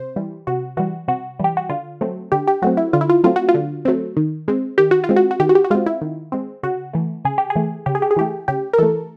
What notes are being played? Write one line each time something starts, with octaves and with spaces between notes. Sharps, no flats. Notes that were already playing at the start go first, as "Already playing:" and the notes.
Already playing: C3 C5
E3 G3
C3 F#4
E3 G3 F#4
C3 F#4
E3 G3 G4
F#4
D3 F4
F#3 A3 C4
D3 G4
G4
F#3 A3 C4 F#4
E4
D3 F4
E4
F4
F#3 A3 C4 F4
F#4
F4
D3
F#3 A3 C4
D#3
G#3 C4
D#3 G4
F#4
F4
G#3 C4
F#4
F#4
D#3 G4
F#4
G4
F#4
G#3 C4 F4
E4
D#3
G#3 C4
C#3 F#4
E3 A3
C#3 G#4
G4
G#4
E3 A3
C#3 G4
G#4
G4
G#4
E3 A3 G4
C#3 G4
A#4
E3 A3 A4